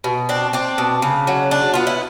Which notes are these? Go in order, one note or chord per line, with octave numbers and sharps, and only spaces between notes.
B2
C4 D4
C4 D4
B2
C#3
F#3
D4
B3 F4
E4